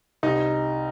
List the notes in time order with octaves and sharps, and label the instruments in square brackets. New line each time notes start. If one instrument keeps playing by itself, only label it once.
[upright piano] C2 D#4